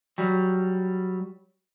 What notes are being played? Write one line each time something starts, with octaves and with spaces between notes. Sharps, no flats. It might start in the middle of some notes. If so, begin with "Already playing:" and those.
F#3 G3